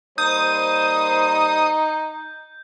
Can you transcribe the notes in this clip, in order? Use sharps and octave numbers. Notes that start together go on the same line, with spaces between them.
G3 A#3 D#4 C5 D#6 G6